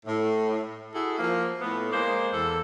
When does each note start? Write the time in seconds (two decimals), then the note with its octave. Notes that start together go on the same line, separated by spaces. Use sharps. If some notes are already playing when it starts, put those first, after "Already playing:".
0.06 A2
0.94 E4 F#4 G#4 A4
1.18 F3 A#3
1.60 A2 B3
1.91 G#3 A#3 C5 D5
2.33 E2 A4